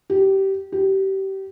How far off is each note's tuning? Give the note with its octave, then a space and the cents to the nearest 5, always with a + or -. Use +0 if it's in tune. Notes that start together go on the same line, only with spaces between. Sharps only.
G4 -20
G4 -25